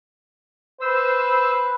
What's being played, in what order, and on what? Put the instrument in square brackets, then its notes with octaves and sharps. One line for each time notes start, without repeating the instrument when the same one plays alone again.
[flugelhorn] B4 [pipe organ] C5 E6